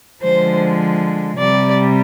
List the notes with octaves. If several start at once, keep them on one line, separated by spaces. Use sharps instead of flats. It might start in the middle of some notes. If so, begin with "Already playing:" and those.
D3 F3 G#3 C5
C3 G3 D5